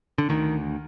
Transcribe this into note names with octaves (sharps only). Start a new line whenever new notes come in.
D3
D2 D#3